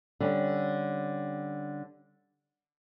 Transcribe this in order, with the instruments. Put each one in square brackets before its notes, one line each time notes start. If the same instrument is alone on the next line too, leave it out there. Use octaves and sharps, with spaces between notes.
[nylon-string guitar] D3 G3 C#4